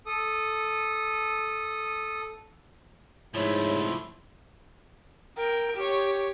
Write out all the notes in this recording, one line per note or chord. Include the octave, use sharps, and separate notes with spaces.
A4 D#6
G#2 F3 A3 E4 C#5
A#4 G5
G4 C#5